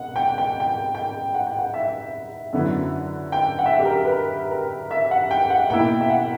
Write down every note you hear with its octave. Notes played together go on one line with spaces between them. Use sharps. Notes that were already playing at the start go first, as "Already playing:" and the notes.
Already playing: C#2 B2 F#5
G5
G5
G5
G5
F#5
G5
F#5
E5
F#2 D3 F#3 B3 E4
G5
F#5
E5
F#5
G4
A#4
B4
A#4
A#4
E5
F#5
G5
F#5
B2 A#3 E4 G5
E5
F#5